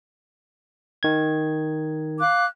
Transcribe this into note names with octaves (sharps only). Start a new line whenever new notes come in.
D#3 G#6
F5 D6 F#6